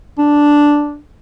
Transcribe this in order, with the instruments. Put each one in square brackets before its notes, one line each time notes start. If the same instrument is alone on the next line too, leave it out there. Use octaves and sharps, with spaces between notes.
[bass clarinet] D4